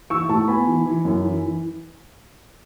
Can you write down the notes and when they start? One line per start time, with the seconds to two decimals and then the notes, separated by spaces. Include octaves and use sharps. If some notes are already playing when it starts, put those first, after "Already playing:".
0.10 E3 C#6 E6
0.29 A2 A5 C#6
0.48 B3 G#5 B5
0.67 E3
0.86 E3
1.05 F#2
1.24 E3
1.42 E3